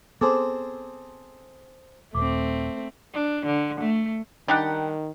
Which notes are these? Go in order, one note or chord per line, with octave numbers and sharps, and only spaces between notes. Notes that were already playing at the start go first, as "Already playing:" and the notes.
B3 C4 G#4 A4 C5 C6 D6
D#1 A3 C4 D6
D4
D3
A3
D#3 G3 D4 D#4 G4 F#5